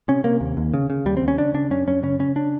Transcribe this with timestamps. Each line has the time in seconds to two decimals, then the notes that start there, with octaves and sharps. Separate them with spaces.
0.08 C3 C#4
0.24 C3 A#3
0.41 D#2
0.57 D#2
0.74 C#3
0.90 C#3
1.06 D#2 G3
1.17 C4
1.22 D#2
1.28 C#4
1.38 C#3 D4
1.54 C#3 D4
1.71 F#2 C#4
1.87 F#2 C#4
2.03 C#3 C#4
2.19 C#3 C#4
2.36 D4